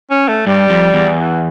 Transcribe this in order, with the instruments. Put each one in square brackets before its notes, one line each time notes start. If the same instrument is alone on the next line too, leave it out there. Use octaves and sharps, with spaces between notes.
[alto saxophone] C#4
A3
[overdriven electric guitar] G2 [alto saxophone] G3
[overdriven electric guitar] F2
E2
[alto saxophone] E3